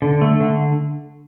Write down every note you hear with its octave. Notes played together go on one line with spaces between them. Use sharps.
D3
A3
D3